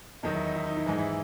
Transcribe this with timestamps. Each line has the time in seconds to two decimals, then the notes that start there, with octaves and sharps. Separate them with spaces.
0.23 E2 D#3 F#3 D#4
0.35 E4
0.45 D#4
0.55 E4
0.66 D#4
0.77 E4
0.86 G#2 E3 D#4
0.98 E4